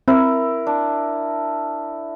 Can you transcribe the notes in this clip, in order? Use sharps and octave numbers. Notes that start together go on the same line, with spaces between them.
C4 E4 A#4
D4